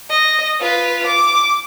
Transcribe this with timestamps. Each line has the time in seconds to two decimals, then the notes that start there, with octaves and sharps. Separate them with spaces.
0.10 D#5
0.61 F4 B4
1.06 D6